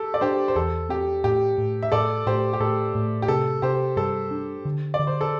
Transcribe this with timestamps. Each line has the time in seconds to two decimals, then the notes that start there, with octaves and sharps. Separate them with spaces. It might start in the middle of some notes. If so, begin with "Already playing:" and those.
Already playing: G4 A4
0.14 D5
0.21 D4 G4 C5
0.48 C5
0.55 E2 A4
0.89 C4 G4
1.24 A2 G4
1.58 A2
1.83 E5
1.92 A2 A4 D5
2.26 A2 G4 C5
2.53 G4
2.60 A2 A4
2.95 A2
3.22 G4
3.28 C3 A4
3.62 C3 G4 C5
3.96 G2 A4
4.31 D4
4.65 D3
4.94 D5
4.99 D3
5.07 C5
5.21 A4